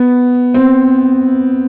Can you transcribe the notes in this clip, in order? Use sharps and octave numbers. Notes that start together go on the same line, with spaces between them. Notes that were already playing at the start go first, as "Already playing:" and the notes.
Already playing: B3
C4